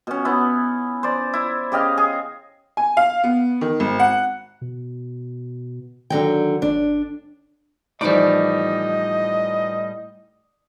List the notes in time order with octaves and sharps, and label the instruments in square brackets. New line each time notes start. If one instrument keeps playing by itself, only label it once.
[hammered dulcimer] B2 C#4
B3 C#4 E4
C5 D5
E4
C#3 G4 D#5 F5
G#4
[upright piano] G#5
F5
B3
D#3
G#1
F#5
[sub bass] B2
[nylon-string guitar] D3 F#3 G5 [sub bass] D#3
[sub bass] G1 [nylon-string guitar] D4
[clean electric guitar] A2 G3 [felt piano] E3 F3 D#4 [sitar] D5 [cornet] D#5